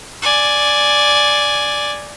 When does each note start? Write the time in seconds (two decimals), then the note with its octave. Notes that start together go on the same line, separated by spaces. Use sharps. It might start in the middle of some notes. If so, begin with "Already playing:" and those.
0.22 D5 G#5